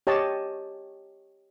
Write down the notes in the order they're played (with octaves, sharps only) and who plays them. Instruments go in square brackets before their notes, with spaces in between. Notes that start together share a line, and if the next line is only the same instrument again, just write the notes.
[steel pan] G4 C#5 D#5 A5